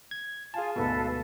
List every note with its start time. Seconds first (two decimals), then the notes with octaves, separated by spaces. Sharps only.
0.11 G#6
0.54 F4 G#4 F5 G#5 A5
0.76 D2 G#2 B2 A4 B4 F5